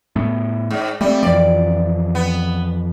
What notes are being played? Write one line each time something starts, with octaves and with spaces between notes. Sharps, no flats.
A2 A3 B3
G#2
G3 A3 C4
F2 E3 F3 D5
B3